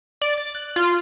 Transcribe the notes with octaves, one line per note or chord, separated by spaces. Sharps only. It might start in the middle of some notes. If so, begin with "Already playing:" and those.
D5
A6
F#6
F4